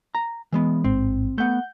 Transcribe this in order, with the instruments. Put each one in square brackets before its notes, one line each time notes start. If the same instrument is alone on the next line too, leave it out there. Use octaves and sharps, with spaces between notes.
[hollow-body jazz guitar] A#5
E3 G#3 B3
[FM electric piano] A1 G#2 [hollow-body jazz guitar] C4
[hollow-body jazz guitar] A3 B3 [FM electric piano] F#5 G6